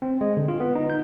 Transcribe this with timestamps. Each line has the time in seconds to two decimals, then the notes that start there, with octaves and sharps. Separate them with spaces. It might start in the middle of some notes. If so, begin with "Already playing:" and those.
0.02 C4
0.21 G#3
0.37 D3
0.48 F4
0.60 B3
0.75 D#4
0.90 G6